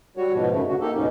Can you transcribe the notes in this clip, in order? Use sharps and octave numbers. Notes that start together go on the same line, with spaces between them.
G3 F#4 C#5
G#2 B2 F3
F#2 C#3 A3
D3 F#4
A#3 D#4 G4 A4
D2 G#2 B2 C#4 D#4